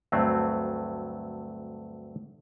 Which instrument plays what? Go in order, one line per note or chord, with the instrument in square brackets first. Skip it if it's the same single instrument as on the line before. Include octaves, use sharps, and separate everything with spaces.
[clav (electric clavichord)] D2 G2 F#3 A3 C4